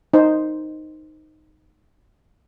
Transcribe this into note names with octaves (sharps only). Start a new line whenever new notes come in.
D#4 C5